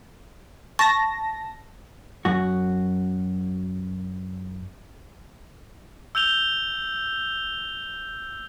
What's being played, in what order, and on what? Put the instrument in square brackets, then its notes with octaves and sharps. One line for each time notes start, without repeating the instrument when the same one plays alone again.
[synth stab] A5 A#6 [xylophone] C#6
[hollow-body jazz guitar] F#2 F#4
[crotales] E6 G6 F7 G7